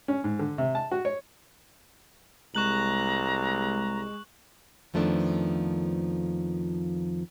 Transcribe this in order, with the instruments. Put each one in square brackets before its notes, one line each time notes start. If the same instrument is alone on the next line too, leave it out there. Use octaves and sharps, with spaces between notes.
[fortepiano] C#4
G#2
D3
C3
A5
F#4
C#5
[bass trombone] C2 [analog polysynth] G#3 [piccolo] A#5 [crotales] C#6 F#6 F#7
[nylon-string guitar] F2 D#3 F3 A3 B3 D4